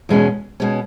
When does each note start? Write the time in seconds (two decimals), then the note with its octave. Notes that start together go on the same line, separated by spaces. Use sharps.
0.09 E2 B2 G#3 C#4
0.60 B2 G#3 C#4